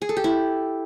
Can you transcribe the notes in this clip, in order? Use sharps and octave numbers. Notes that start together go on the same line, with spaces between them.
G#4
A4
G4
E4